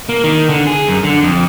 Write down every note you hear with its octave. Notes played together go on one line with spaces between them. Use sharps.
A#3
D#3
D3
G#4
F#2
D3
F2